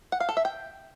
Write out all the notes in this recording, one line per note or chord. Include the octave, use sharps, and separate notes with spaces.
F#5
F5
A4
E5
G5